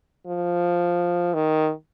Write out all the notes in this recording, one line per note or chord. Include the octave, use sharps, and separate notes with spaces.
F3
D#3